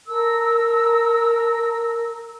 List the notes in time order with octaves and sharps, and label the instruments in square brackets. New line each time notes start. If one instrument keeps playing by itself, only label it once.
[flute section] A4 A#4 E6